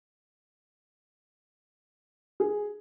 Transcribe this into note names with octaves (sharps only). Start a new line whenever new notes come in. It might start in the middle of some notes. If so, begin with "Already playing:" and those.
G#4